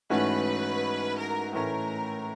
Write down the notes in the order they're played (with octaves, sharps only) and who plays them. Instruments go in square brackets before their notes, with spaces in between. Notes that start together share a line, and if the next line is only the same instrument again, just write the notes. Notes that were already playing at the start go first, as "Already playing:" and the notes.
[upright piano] G#2 E3 A3 C#4 F#4 [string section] B4
[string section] A#4
[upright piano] A2 E3 A3 C#4 [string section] A#4